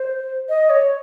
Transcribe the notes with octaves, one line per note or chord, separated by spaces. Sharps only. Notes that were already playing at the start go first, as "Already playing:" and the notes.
Already playing: C5
D#5
C#5